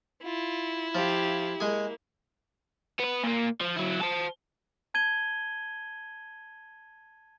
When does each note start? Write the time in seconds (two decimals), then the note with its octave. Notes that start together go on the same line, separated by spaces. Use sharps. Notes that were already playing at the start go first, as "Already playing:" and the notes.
0.24 E4 F4
0.95 F3 G4 F5
1.60 G#3 A#3 G#4
2.99 B3 B4
3.23 A#2 A#3
3.61 F3
3.76 F#3 E4
4.02 C5 A5
4.94 A5 G#6 D#7 G7